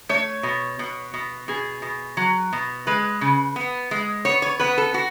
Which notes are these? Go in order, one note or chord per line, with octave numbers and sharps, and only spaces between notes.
A3 C#5
B2
B2
B2
B2 G#4
B2
F#3
B2
G#3 B4
C#3
B3
G#3
B3 C#5
C#5
B3 B4
A4
F#4